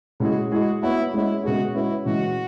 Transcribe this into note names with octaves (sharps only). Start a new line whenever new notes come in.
C#3 G#3 E4 F#4 G#4
G#3 E4 F#4 G#4
B3 E4 F#4 C#5
G#3 C#4 E4 F#4 C#5
C#3 G#3 B3 F#4 G#4 C#5
G#3 C#4 E4 F#4 B4
C#3 E3 G#3 F#4